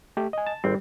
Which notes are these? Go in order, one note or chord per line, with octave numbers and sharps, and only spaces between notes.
A3 G4
D#5 G#5
A5
G#1 G3 C4